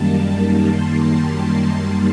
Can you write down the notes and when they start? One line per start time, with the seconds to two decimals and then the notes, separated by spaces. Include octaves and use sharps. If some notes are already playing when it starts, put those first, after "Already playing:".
Already playing: F#2 D#3 G3 A#3 A5
0.69 C6